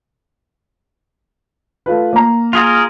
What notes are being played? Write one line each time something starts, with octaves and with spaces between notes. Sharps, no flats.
A3 F4 B4
A#3 A#5
F4 G#4 A#4